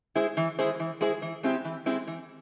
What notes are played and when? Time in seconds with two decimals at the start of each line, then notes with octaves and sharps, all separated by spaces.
0.15 G#3 E4 G#4 C5
0.37 E3
0.59 G#3 E4 G#4 C5
0.80 E3
1.01 G#3 E4 G#4 C5
1.22 E3
1.43 G#3 C4 E4 G4
1.65 E3
1.86 G#3 C4 E4 G4
2.07 E3